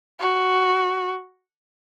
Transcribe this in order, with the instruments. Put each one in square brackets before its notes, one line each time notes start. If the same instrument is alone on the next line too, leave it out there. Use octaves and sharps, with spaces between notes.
[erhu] F#4